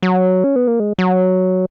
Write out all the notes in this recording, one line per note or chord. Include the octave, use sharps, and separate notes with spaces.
F#3
C#4
B3
A#3
G#3
F#3